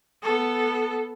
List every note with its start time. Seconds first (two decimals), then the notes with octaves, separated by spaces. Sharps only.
0.22 B3 A4